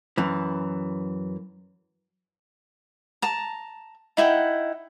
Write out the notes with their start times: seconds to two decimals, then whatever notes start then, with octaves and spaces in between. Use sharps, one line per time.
0.18 F#2 E3
3.22 A5 A#5
4.17 D#4 E4 F#5 G5